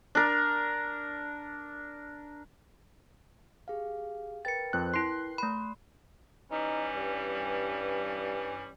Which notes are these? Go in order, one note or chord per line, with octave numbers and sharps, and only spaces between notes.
D4 A#4
G4 G#4 F5
A#4 B4 G5 A6 C#7
F2 C4 F#6
E4 C6 C7
A3 B5
E3 G3 C#4 D#4
G2